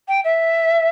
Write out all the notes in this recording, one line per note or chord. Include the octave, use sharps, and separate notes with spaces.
G5
E5